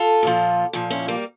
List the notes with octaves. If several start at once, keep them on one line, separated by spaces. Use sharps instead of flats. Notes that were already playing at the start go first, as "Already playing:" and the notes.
Already playing: F4 A4
A#2 F3
A#2 F3
C#4 E4
G3 A#3